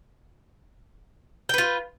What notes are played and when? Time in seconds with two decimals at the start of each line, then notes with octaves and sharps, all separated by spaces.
1.49 G5
1.54 B4
1.58 F4